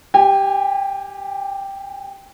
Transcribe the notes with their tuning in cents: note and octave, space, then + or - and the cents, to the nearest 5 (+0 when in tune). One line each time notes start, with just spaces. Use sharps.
G4 +0 G#5 -35